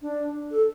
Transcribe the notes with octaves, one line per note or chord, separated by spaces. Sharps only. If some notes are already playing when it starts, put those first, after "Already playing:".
D4
A4